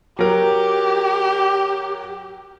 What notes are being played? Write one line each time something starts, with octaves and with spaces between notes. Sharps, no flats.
F#3 G4 A#4